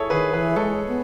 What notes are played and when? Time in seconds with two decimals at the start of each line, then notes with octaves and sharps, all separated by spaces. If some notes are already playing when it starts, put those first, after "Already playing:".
Already playing: E4 G#4 A4 C#5
0.10 D#3 G#4 B4
0.33 E3 G#4 B4
0.56 G#3 A4 C#5
0.88 B3